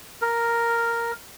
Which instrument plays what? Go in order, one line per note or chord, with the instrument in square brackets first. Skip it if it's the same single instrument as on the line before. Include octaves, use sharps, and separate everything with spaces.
[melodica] A#4